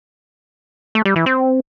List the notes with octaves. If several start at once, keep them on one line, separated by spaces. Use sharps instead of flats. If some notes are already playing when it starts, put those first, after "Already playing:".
A3
G3
E3
C4